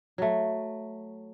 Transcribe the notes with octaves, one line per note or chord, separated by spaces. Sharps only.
F#3 A3